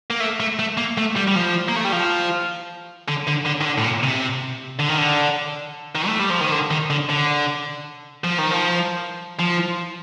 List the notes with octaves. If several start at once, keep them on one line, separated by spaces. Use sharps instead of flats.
A#3
A3
A3
A3
A#3
A3
G3
G3
F3
A#3
A3
G3
F3
D3
D3
D3
D#3
D3
A2
A#2
C3
D3
D#3
D3
D#3
A3
G3
F3
D#3
D3
D#3
D3
D3
F3
D#3
F3
F3